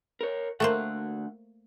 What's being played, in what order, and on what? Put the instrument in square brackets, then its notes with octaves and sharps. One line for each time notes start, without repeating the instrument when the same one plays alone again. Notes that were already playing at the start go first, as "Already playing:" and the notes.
[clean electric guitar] A#4 C#5
[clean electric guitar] D2 F#5 [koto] A3 A#3 C5